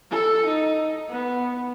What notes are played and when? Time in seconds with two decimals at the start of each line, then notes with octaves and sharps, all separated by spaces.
0.11 A4
0.45 D#4
1.09 B3